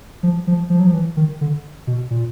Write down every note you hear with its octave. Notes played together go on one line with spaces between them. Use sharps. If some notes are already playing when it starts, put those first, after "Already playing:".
F3
F3
F3
F#3
F3
E3
D#3
D3
B2
A#2